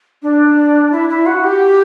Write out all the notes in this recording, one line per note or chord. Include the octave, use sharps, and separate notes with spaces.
D4
E4
E4
F#4
G4